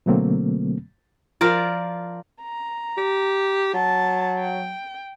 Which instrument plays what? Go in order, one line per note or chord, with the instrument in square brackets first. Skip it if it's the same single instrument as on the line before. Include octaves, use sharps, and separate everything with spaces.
[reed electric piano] B2 D3 F#3 A3 A#3 C4
[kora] F3 F4 A#4 D5
[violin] A#5
[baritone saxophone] G4
[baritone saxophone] F#3 [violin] A5
[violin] G5